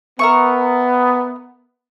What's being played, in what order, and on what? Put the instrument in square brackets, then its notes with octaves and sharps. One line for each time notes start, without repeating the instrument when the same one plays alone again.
[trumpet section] B3 [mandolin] A#4 E5 C#6